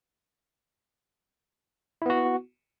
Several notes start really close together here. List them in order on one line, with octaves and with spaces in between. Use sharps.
E4 B3 F#4